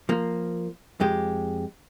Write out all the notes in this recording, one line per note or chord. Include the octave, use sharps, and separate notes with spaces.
F3 A#3
F2 G#3 G4